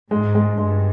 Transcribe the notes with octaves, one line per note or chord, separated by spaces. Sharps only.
G#2 G#3
G#3
G2 G#3